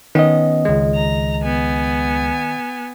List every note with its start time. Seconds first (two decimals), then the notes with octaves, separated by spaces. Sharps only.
0.15 D#3 B3 C#4 D#5
0.65 C#2 G#3
0.95 A#5
1.44 B3 G#5